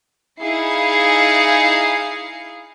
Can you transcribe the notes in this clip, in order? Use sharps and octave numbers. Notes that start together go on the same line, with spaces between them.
D#4 E4 G#4 F5 C7 C#7